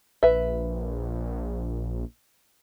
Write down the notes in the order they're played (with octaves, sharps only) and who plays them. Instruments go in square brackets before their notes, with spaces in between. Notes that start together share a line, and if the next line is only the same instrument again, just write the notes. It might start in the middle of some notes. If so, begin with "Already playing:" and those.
[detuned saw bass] A#1 [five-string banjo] B4 E5